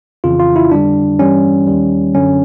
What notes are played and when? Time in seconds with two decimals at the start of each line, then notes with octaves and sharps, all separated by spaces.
0.24 F2 C#3 E3 F4
0.40 F4
0.56 E4
0.71 F2 D3 G3 D4
1.19 G2 E3 G3 C#4
1.67 D#2 D#3 G3
2.14 F#2 D3 F#3 C#4